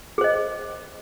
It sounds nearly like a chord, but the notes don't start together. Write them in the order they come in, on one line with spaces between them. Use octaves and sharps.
G#4 C5 D#5